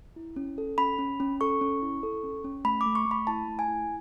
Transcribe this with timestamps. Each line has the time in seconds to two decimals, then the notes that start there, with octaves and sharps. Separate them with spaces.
0.16 E4
0.36 C#4
0.58 A4
0.78 C#4 B5
0.98 C#4
1.20 C#4
1.41 A4 C#6
1.61 C#4
1.82 E4
2.03 A4
2.23 C#4
2.44 C#4
2.65 A3 B5
2.81 D6
2.86 A3
2.95 C#6
3.06 A3
3.11 B5
3.27 E4 A5
3.48 A3
3.59 G#5
3.68 E4